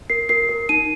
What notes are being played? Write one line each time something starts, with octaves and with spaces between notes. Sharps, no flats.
A#4 C7
A#4 C7
A#4
D#4 D#7